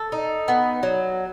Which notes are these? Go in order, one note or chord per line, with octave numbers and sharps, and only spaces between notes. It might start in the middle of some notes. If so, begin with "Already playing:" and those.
Already playing: A4
D#4
B3
F#3